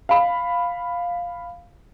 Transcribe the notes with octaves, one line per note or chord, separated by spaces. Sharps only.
F5 B5